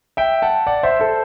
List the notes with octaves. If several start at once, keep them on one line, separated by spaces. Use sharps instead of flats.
E5 G5
F#5 A5
D5 F#5
C5 E5
A4 C5